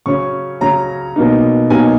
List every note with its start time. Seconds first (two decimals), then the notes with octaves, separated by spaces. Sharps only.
0.06 C#3 F#3 C#4 C#6
0.61 C#3 F#3 C#4 A#5
1.16 B2 F#3 A#3 D#4
1.70 B2 F#3 A#3 D#4 G#5